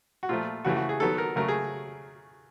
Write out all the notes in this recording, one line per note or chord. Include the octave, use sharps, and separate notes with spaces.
F#4
A#2 F3 A3 F4
C#3 E3 A3 F#4
F#4
G#4
D#3 F#3 B3 A4
A#4
C#3 F#3 A3 A#4
G#4